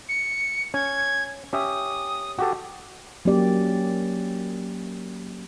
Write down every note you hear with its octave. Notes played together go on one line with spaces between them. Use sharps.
C#7
C#4 G#6
C#4 G4 E5 D#6
F#4 G4 A4
F#3 A#3 C#4 G4 D5